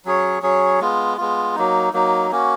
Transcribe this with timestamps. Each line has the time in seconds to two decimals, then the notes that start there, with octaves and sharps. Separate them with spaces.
0.05 F#3 C#4 G#4 C#5
0.42 F#3 C#4 G#4 C#5
0.80 G#3 B3 F4
1.18 G#3 B3 F4
1.55 F#3 A#3 D#4
1.93 F#3 A#3 D#4
2.31 A#3 C#4 F#4